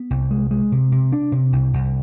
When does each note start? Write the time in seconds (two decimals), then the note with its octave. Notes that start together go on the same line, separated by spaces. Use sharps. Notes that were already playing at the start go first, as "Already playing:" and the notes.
Already playing: B3
0.10 C2
0.31 G#3
0.51 G#3
0.72 C3
0.92 C3
1.13 D4
1.32 C3
1.53 C2
1.73 C2